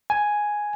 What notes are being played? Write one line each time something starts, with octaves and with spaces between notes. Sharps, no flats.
G#5